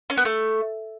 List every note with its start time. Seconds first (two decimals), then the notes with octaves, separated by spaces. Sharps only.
0.10 C#4
0.17 B3
0.25 A3